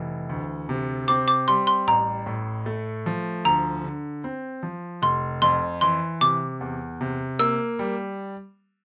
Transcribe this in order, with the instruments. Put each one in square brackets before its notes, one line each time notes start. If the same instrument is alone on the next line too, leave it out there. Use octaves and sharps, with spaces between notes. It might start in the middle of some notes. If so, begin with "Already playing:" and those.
Already playing: [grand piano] F1 E3
D2
C3
[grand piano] C4 [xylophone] D6
[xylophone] D6
[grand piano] G3 [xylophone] C6
[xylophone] C6
[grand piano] A1 [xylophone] A#5
[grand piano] A2
A3
F3
[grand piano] D2 [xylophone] A#5
[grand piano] D3
C4
F3
[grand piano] F1 [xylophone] C6
[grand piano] F2 [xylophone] C6
[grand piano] E3 [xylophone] C6
[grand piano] C3 [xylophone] D6
[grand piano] E2
C3
[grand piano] A#3 [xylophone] E6
[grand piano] G3